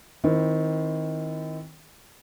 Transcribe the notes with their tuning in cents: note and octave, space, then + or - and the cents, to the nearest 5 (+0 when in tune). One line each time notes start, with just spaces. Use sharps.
D#3 +20 C4 +0 E4 +35